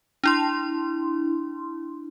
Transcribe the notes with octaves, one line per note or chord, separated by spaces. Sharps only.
D4 E4 C6